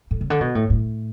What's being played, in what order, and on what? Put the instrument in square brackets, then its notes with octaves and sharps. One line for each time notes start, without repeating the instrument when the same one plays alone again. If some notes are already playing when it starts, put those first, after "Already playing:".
[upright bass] A2
C#3
D3
B2
A2
A2